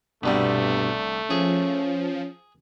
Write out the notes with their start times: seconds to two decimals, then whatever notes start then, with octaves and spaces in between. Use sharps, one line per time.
0.23 C2 G2 B2 D3 G3 A3
1.30 F3 C#4 G#4